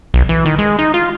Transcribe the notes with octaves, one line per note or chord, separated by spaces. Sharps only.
B1
E3
D#3
G#3
D#4
F4